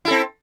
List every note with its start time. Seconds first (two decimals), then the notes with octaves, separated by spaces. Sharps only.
0.05 E4
0.08 A4
0.10 C4